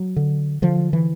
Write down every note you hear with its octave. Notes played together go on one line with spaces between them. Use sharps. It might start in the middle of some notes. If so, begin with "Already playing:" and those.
Already playing: F#3
D3
D3 F3
E3